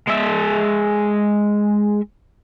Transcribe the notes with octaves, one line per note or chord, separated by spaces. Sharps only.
G#3 E5